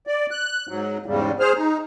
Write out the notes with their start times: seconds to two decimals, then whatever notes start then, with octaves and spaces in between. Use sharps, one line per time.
0.07 D5
0.31 F#6
0.69 G#2 F#3
1.06 E2 G#2 C#3 G3
1.40 G#4 C5 F6
1.57 D#4